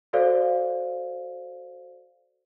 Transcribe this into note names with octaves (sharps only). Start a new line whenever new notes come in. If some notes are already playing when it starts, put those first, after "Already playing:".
F#4 A4 C5 D5 F5